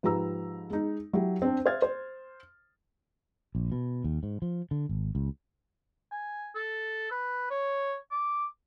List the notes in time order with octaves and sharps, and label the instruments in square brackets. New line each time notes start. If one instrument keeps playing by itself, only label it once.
[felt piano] G#2 F3 G4 B4 A#5 E6
G#3 D#4
F#3 E4 G4
C4 D4
C5 E5 F5 F6 G#6 A6
C5
[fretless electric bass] A#1
B2
D#2
G#2
F3
D3
G#1
C#2
[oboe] G#5
A4
B4
C#5
D6